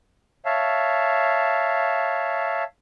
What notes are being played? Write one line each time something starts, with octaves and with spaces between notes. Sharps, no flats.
C#5 E5 F5 A5